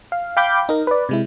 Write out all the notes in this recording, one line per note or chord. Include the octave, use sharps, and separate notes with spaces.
F5
F5 G5 B5 D6 G6
D#4 A#4
B4 D5
C3 G#3 E4